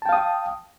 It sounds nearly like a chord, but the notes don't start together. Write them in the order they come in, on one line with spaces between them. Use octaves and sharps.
A5 G5 F5 D#6